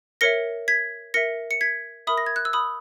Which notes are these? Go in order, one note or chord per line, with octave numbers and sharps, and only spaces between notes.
A#4 C#5 E5 A#6 C#7
G#6 B6
A#4 E5 A#6 C#7
C#7
G#6 B6
A#4 E5 B5 D#6
A#6
G#6
F#6
E6
B5 D#6